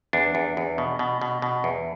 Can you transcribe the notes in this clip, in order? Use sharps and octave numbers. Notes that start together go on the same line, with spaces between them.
E2 D4
E2
E2
B2
B2
B2
B2
E2